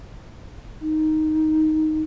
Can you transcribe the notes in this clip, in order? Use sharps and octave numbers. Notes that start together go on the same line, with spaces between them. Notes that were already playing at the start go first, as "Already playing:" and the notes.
D#4